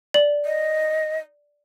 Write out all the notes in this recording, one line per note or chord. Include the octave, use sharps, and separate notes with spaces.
D5 F#7
D#5